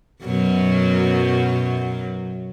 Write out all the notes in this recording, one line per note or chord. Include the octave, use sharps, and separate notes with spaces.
F#2 B2 F#3